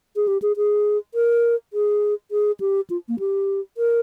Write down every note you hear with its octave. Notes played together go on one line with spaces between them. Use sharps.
G#4
G4
G#4
G#4
A#4
G#4
G#4
G4
F4
A#3
G4
A#4